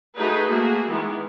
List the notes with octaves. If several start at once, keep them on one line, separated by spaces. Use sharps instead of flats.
A3 D#4 F#4 G#4 B4
A3 A#3 F#4 G#4
D#3 E3 G#3 B3